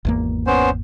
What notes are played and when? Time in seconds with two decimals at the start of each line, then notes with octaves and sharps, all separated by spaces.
0.05 G#1 E2 A#3
0.47 B3 C#4 C5